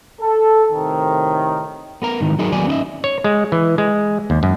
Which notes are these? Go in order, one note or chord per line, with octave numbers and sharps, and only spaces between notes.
A4
A2 C3 D#3
B3 A#4 A#5
G#2 D#3 E3
F#3 D#4 E4 G#4 A#4
D#2 F#3 B3 D5 G#5
C#4 D#4 E4 D#5 E5
C#5
G#3
E3
G#3
D#2
F#2